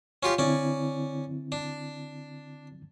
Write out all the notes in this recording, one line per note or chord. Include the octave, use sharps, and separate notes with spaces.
C#4 F4 G4
D3 C4 C#4 E4 D5
D4